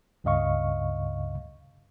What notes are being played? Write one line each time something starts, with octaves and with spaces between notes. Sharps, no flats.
C#2 G2 C#3 D#5 F5 C#6